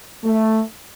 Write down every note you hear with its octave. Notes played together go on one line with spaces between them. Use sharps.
A3